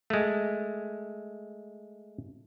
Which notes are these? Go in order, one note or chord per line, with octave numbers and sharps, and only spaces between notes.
G#3 A3